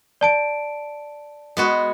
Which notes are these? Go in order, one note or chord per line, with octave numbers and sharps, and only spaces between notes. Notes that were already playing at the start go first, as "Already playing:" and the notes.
D5 A5 D7
G#3 B3 F#4